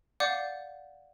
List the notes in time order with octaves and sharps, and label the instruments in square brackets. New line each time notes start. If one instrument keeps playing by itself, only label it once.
[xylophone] D5 F5 F#5 D6 G6